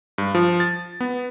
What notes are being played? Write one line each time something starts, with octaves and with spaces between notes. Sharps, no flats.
G2
F3
A6
B3